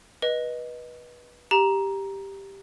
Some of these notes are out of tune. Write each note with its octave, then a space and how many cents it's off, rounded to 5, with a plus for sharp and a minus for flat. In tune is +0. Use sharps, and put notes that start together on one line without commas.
B4 -25 D#5 -5
G4 +0 A#5 +10